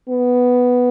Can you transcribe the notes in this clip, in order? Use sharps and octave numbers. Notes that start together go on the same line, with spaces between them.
B3